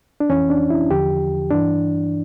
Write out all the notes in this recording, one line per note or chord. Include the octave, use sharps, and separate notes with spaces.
D4
F2 E3 C#4
D4
E4
E2 D3 F3 G4
G2 E3 D4